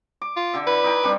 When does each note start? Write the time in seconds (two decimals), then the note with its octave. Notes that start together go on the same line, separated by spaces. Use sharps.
0.22 D6
0.36 F4
0.54 D3 G4 E5
0.67 E4 B4
0.84 D#4 E4 G5
1.03 G3 C4 D4